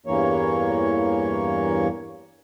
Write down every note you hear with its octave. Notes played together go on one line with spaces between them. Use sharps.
E2 G2 E3 A#3 C#5